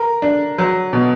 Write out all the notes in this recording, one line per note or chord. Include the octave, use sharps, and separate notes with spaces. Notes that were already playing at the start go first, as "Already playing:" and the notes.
Already playing: A#4
D4
F#3
B2